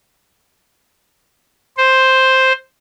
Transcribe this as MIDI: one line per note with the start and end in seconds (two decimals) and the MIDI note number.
1.77 2.52 72